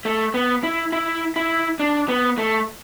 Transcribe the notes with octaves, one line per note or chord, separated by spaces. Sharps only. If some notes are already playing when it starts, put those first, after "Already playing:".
A3
B3
E4
E4
E4
D4
B3
A3